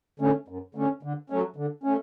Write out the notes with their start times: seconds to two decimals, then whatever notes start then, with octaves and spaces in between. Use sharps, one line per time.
0.20 D3 A3 C#4
0.48 F#2
0.75 D3 A3 C#4
1.03 D3
1.30 F#3 A3 C#4
1.56 D3
1.84 A3 C#4